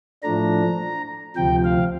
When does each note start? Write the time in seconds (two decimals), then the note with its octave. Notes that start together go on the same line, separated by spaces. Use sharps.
0.23 A2 F3 A3 D4 A#5
1.36 D2 C3 F3 G5
1.64 F5